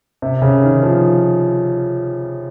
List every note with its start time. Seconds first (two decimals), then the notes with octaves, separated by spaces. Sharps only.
0.22 C3
0.42 C#3
0.63 D#3
0.83 F3